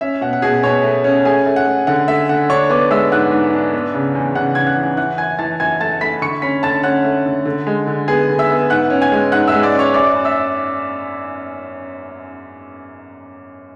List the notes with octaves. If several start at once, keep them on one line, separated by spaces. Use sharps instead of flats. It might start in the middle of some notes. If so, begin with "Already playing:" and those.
C#4 E5
B2 F#5
F#5
B2 G#4 G#5
B2 C#5 C#6
A3
C#4
A3 G#4 G#5
A3
F#5
A3
D3 F#5
A3 E5
D3 F#5
D4 C#5 C#6
B3 D5 D6
G#3 E5 E6
G#2 F#5 F#6
G#2
D4
B3
C#3
E2
C#3 F#5 F#6
C#3 G#6
F#5 F#6
E3
E3 F#5 F#6
F#2 G#5 G#6
E3 A5 A6
F#2 G#5 G#6
A3 A5 A6
A3 B5 B6
D3 C#6 C#7
C#4 B5 B6
D3 A5 A6
C#4 F#5 F#6
A3
D3
D3
G#3
D3
B3 G#4 G#5
D3
E5 E6
B3
G#2 F#5 F#6
C#4
G#5 G#6
G#3
G#2 F#5 F#6
G#3 E5 E6
D5 D6
C#4
C#5 C#6
F#2 D5 D6
F#2
E5 E6